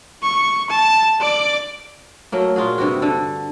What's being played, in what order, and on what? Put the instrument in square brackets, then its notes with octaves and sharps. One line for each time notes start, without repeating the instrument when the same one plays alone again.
[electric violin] C#6
A5
D5 D6
[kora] F#3 A3 A#3
A#2 F4 F#4 G#4
G2 C3 G3 F#4
D3 A4